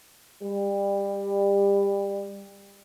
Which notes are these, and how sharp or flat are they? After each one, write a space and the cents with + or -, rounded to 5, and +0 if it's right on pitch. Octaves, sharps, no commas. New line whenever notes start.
G3 +25